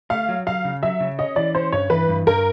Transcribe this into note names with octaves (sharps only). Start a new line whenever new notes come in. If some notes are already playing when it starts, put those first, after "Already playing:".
A3 F5
F#3
F#3 F5
C#3
F#3 E5
C#3
C#4 D#5
E3 D5
C#4 C5
G2 C#5
E3 B4
G2
G2 A#4